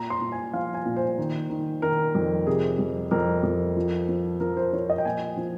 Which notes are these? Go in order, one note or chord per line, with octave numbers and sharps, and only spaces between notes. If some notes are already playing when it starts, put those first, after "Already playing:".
Already playing: A#2 A#5
C6
A#2
G#5
F3 F5
G#5
A#2
C5
D#3
D#3
D#3 A#4
F2
C3 G#4
F2
F2 A#4
F2
F3
F3
F3 A#4
C5
F3 C#5
D#5
G5
A#2 G#5
F3